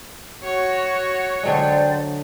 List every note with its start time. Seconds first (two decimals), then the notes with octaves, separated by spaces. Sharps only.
0.43 F#4 C#5
1.43 D3 F#3 G#3 C5 D5 G5